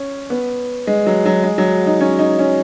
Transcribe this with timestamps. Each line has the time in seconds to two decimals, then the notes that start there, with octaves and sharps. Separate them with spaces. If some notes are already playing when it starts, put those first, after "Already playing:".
Already playing: C#4
0.30 B3
0.87 G#3
1.07 F#3
1.26 F#3
1.43 G#3
1.58 F#3
1.86 D#4
2.01 C#4
2.19 D#4
2.39 C#4